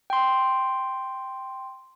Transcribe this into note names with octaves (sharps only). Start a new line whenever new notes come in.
G5 C6